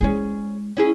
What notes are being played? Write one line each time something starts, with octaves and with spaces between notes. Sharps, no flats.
G#3 C#4 E4 G#4
C#4 E4 G#4